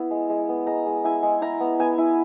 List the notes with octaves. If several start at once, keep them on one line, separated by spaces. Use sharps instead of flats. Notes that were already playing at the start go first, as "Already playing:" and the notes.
Already playing: B3 E4
G#3
G#3
B3
G#3 A#5
G#3
E4 G#5
G#3
E4 A#5
B3
B3 G#5
E4